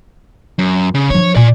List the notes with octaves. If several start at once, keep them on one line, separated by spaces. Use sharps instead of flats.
F#2
C#3
F3 D4 C#5
A#2 D5 G#5